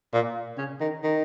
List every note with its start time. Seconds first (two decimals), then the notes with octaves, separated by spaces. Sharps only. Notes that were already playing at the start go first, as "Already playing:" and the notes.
0.13 A#2
0.58 C#3
0.80 D#3
1.03 D#3